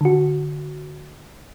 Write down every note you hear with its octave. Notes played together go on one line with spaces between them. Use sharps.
D3 F#4